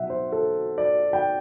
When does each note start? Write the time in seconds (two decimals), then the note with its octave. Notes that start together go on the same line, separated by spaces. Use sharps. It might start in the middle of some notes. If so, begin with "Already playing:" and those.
Already playing: B2 F#3 E5 F#5
0.10 C5
0.32 A4
0.78 D5
1.13 G5